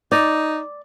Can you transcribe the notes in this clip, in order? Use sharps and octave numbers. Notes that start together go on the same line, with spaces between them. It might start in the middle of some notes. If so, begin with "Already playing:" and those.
D#4 D5